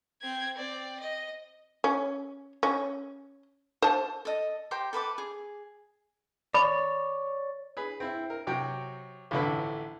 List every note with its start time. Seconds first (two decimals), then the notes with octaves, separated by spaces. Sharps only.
0.22 C4 G#6
0.56 C4 D5
1.00 D#5
1.84 C#4
2.63 C#4
3.82 C5 A5
4.25 A4 D#5
4.71 G4 C5 A#5
4.93 A4 B4 E5 D6
5.18 G#4
6.54 C#5 D5 B5
7.77 G#4 B4
8.00 C4 E4
8.30 A#4
8.47 C3 F#3 G5
9.31 A1 F2 D3 E4 B4